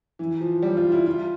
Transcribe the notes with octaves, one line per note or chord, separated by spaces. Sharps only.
E3
F3
G3
F4
E4
F4